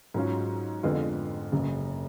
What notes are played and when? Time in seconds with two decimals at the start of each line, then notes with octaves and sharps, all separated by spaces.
0.14 G#2 F#3 C#4 F4
0.83 F2 D3 G#3 B3 F4
1.52 F#1 F#2 C#3